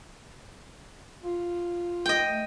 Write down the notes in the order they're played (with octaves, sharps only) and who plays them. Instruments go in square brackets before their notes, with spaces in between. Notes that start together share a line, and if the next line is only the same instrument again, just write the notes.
[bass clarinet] F4
[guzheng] D#5 G5
[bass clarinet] A3